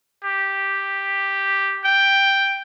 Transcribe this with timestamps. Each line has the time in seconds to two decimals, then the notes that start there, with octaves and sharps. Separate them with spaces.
0.24 G4
1.85 G5